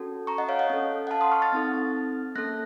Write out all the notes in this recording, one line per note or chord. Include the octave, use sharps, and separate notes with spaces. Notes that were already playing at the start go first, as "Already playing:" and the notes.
Already playing: C#4 F#4 A4
A#5 C#6
D#5 F#5
C#5 F5
D#5 F#5
C#4 A4
F#5
F5 A5
C6 D#6
C#6 F6
F6 A6
C4 D#4 A4
A#3 C#4 A4 F#6 A#6